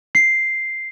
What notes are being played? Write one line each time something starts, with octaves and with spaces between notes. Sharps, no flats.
C7